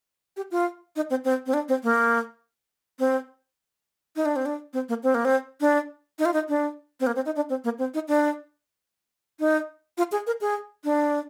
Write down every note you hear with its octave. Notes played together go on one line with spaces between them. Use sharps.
G4
F4
D#4
C4
C4
C4
D4
C4
A#3
C4
D#4
D4
C4
D4
C4
A#3
C4
A#3
C4
D4
D#4
F4
D#4
D4
C4
A#3
C4
D#4
D4
C4
A#3
C4
D#4
D4
D#4
F4
G#4
A#4
G#4
D4